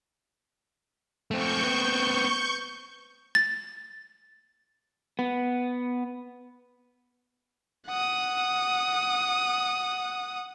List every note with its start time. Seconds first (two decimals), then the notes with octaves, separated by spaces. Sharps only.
1.31 A3 C4 C#6 G6
1.63 B3 C4
3.35 A6
5.19 B3
7.87 F#5 D#6